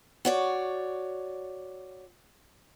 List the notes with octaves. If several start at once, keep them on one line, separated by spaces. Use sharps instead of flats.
F#4 C#5 D5